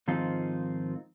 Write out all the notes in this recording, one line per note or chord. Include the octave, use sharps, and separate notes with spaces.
G#2 D#3 F3 C4 D#4 F4